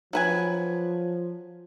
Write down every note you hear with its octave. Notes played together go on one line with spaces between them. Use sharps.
F3 F#3 B4 G#5